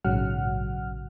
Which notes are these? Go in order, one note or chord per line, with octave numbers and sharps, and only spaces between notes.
A#1 G#2 C#3 F#3 F#5 F6